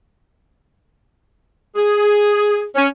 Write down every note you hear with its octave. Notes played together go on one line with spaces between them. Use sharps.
G#4
C#4